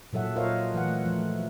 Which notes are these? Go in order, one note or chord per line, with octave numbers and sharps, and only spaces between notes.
A#2 F#3 A4 E5 F#5
F4 A#4 C5 C#5 D#5 F5
E3 A3 F#5
F3 A3